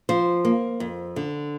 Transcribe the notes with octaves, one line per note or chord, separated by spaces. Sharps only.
F3 C5
A#3
F2
D3